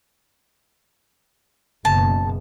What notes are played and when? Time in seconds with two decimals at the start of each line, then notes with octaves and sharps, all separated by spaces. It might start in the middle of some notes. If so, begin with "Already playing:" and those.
1.85 F#1 B2 A5